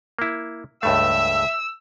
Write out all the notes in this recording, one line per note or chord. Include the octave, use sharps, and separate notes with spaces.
A#3 E4
C#2 G2 A3 E5 E6